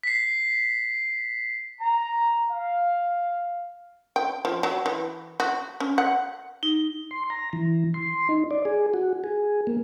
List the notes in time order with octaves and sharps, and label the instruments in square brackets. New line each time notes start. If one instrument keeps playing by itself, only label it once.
[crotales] B6 C7
[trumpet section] A#5
F5
[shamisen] G5
F3
F#3
E3
F#4
C#4
F#5
[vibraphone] D#4
[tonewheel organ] C6
A#5
E3
C6
D#4
D5
G#4
F#4
G#4
A#3